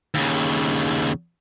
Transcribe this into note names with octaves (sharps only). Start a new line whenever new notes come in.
D#2 C#3